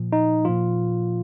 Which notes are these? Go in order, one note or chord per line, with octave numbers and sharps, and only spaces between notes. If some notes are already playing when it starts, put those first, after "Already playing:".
Already playing: A#2 F3
D#4
A#2 F3 F4